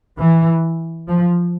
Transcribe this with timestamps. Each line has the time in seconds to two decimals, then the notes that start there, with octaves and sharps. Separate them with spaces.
0.18 E3
1.08 F3